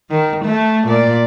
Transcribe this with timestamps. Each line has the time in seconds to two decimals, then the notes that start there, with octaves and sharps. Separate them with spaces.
0.10 D#3
0.45 A3
0.87 A#2 D5